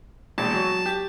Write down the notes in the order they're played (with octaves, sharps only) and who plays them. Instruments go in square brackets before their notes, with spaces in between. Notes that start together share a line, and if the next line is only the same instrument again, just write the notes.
[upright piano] E1 A#1 [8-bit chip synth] A5
[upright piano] F#3
G4